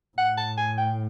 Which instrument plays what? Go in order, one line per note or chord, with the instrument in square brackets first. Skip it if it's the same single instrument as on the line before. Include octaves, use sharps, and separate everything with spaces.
[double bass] A2 [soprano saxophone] F#5
[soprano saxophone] A5
G#5
G5